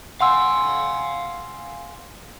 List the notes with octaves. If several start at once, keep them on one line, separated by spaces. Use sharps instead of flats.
F5 F#5 G#5 C6 E6